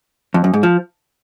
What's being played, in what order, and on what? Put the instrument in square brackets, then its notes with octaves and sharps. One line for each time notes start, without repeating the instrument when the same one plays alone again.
[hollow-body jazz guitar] F2
F#2
G#2
F3